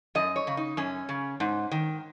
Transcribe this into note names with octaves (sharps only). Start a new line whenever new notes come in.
F#2 D#5
C#5
C#3
D#4
F#2 C#4
C#3
G#2
D#3